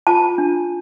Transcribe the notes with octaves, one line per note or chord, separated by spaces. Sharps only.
F4 A5
D4